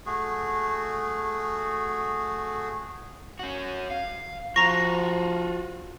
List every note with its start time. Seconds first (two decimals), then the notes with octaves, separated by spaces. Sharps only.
0.06 A3 F#4 G#4
3.39 C#4 F#4
3.90 F5
4.56 F3 F4 F#4 A#5 C#6 A#6